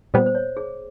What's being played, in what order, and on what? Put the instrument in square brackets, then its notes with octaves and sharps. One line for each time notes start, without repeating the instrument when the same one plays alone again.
[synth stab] A#2 G3 B3 [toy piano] C5
[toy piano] C5
C#5
G#4